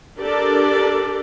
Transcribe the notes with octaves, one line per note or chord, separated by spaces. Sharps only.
D4 G4 A4 A#4 D5